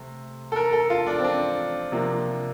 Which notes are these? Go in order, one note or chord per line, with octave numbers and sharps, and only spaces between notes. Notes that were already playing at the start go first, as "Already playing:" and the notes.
Already playing: C3 A3
A4
A#4
A4
F4
D4
C4
D4
C3 F3 A#3